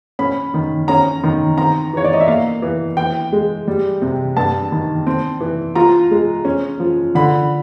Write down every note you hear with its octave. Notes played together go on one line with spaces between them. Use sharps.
C#4 B5
D#3
C#4 A#5
D#3
C4 A#5
E3 C#5
D5
D#5
E5
A#3 F5
E3
E3 G5
G#3
G3
C3
G2 A5
D#3
C4
E3
F4 A#5
G#3
C#4
F3
D3 B5